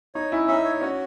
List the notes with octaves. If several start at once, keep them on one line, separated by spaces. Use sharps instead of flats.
D#4 C#5
C#4 E4
D#4 E5
C#5
C#4 F#4